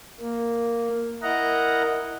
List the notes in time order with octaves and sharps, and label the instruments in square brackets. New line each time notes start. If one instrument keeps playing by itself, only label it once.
[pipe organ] A#3
E4 A#4 D#5 F#5 A#5